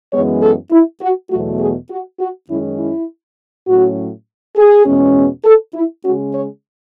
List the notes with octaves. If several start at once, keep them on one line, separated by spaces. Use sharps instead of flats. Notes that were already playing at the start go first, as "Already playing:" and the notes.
F#2 E3 G#3 B3 C#5
A4
E4
F#4
E2 B2 F#3 A3 F#4
G#4
F#4
F#4
F#2 D#3 G#3 C#4 E4
E4
A2 F#3 C#4 F#4
G#4
E2 B2 G#3 C#4
A4
E4
C#3 G#3 C#4 F#4
C#5